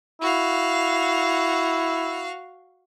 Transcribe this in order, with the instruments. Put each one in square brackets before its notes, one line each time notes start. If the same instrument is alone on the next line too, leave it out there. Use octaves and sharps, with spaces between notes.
[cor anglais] E4 [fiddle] F#4 F5